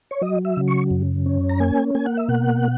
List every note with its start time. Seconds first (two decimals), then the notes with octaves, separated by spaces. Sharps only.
0.11 C#5
0.21 F#3 D#5
0.45 E5
0.57 C#3
0.68 C#6
0.91 F#2
1.26 C#4
1.49 A#5
1.60 A#3 G#5
1.95 A#3 G#5
2.06 F#5
2.17 E5
2.29 B2 F#5